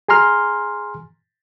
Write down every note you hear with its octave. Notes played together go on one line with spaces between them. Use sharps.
G#4 G#5 A#5 C6 F6